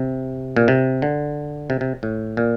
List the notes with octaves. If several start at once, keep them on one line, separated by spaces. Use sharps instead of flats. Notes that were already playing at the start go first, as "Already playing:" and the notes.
Already playing: C3
A#2
C3
D3
C3
C3
A2
A#2